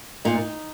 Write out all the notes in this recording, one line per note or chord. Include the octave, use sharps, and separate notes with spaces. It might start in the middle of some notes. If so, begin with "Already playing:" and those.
A#2 D#4